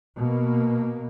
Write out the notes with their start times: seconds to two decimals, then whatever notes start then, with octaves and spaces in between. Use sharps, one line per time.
0.19 B2 A#3